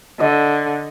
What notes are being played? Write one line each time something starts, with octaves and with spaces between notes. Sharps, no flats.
D3 D#5